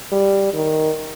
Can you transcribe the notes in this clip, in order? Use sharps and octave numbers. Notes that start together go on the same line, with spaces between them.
G3
D#3